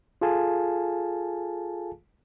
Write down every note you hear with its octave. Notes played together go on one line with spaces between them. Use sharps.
F4 G#4 A4 F5 G#5 A5